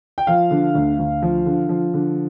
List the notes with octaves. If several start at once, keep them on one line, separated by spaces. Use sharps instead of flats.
G5
F3 F5
D3
D2
D2
F3
D3
F3
D3